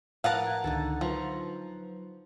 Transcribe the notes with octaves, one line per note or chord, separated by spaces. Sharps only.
A2 F3 A#4 B4 F5 F#5 A5
G#6 A6
C#2 D3 D#3 D#4 A4 A6
F3 F#3 F4 B4 A#5 C#6